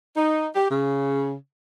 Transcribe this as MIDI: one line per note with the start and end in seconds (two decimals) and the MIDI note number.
0.15 0.45 63
0.54 0.65 67
0.69 1.33 49